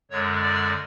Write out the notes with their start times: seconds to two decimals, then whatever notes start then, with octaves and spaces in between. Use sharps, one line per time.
0.11 F#2 D3 G#3 C#5
0.42 D5